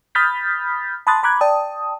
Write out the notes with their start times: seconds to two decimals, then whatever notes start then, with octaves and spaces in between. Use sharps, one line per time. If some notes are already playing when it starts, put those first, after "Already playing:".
0.15 B5 D#6 F6 G6 A6 B6
1.07 A5 B5 C6 D#6 F#6 A6
1.23 A#5 B5 D6 F#6 G#6
1.41 D5 G5 A5 D#6